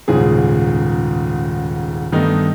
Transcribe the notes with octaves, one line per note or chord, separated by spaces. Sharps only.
D#1 G#2 C#3 G#4
G2 D#3 A3 B3 D#4